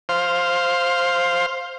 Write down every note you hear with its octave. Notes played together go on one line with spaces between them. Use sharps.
C5 F5